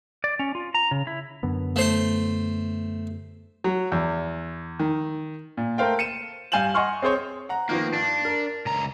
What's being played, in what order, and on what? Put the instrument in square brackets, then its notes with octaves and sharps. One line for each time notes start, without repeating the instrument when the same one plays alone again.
[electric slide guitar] D5
C#4
F4
A#5
C#3
E4
[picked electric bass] F#2 D3 B3
[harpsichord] A3 C5 C6
[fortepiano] F#3
E2
D#3
[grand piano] A#2
A3 A#4 C5 F5 G5
C#7 D#7 E7
G2 F5 G#5 G6 E7 F#7
D#5 F#5 G#5 C6 C#6 F6
C4 G#4 C5 C#5
[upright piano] F#5 A#5
[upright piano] D#3 F3 B3 [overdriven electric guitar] A#3
[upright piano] G2 [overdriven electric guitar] D4
[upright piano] A#4
[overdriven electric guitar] C#2 A#5